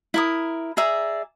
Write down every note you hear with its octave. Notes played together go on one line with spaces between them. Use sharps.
E4 A#4 D#6
G#4 D5 E5 A#5